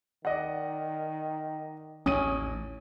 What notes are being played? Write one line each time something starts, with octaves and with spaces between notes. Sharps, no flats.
D#3 D5 D#5 F#5
A1 D#2 C#4 D#6 D#7